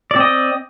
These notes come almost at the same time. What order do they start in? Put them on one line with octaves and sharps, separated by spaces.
D5 C4 D#5